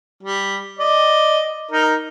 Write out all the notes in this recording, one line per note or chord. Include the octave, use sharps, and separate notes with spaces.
G3
D5 D#5
D#4 A#4